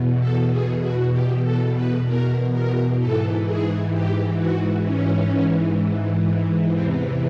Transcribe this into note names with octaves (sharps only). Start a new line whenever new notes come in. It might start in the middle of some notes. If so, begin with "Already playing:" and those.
Already playing: E2 B2
A4
G#4
F#4
G4
A4
B4
A#4
A#4
G#2 E3 A4
G#4
G4
F#4
C#4
E2 C3 E3 C4